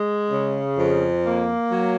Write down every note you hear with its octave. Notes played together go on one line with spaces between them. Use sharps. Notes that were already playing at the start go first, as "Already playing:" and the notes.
Already playing: G#3
C#3
F2
A#3
F#3